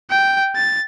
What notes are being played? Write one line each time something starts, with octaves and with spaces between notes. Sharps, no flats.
G5
A6